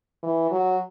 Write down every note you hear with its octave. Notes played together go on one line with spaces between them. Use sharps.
E3
F#3